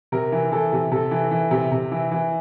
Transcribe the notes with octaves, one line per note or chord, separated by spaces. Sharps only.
C3 A#4
E3
E3 A4
C3
C3 A4
E3
E3
C3
C3
E3
E3